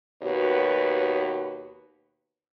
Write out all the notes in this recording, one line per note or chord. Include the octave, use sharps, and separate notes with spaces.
D#2 B2 F#4 B4 C#5